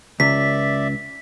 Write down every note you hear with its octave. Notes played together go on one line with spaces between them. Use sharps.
C#2 D5 E5 B6